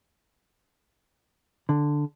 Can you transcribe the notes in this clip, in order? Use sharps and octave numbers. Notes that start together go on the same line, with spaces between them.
D3